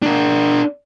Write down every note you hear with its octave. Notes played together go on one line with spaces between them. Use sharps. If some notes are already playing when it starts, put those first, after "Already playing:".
D4 A#4